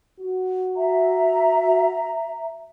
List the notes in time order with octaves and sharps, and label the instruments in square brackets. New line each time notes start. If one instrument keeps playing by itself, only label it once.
[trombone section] F#4
[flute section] E5 A#5